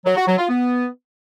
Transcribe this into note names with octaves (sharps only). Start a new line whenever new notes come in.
F#3
F#4
F#3
F4
B3